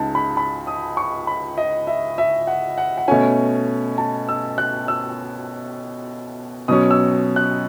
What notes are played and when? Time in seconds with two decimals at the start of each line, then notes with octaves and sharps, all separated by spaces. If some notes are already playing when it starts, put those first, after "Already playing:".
Already playing: C#2 C#3 G#3 D#4 A5
0.15 B5
0.37 B5
0.67 D#6
0.97 C#6
1.27 B5
1.58 D#5
1.87 E5
2.18 E5
2.47 F#5
2.78 F#5
2.98 F#5
3.08 B2 A3 C#4 G#5
3.98 A5
4.29 E6
4.58 F#6
4.88 E6
6.68 B2 F#3 C#4 D#6
6.91 E6
7.36 F#6